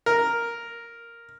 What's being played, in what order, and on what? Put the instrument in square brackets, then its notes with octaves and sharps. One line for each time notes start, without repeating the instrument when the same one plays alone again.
[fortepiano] A#4